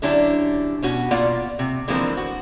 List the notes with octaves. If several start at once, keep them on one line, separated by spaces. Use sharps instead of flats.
D3 F#3 C#4 D4 E4 G4
B2 C#4 F#4
B2 A#3 F4 D5 F#5
C3
D3 E3 F3 G#3 A#3 C4
F#4